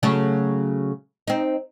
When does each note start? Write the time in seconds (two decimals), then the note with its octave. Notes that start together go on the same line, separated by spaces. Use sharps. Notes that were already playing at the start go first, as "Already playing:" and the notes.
0.03 C#3 F#3 A3
1.27 C4 D#4